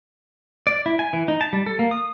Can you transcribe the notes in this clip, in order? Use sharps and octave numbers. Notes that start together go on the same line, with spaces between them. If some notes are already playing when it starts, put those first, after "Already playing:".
D5
E4
G#5
E3
D#4
A5
G3
A4
A#3
D#6